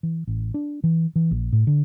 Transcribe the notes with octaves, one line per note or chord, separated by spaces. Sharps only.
E3
A1
D4
E3
E3
A#1
A2
D3